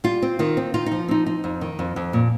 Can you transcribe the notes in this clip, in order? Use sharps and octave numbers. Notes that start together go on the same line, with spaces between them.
G3 F4
C4
D#3 F4
C4
D#4 F4
D#4
F3
C4 D#4
D#4
F2
D#3
F2
F2
A#2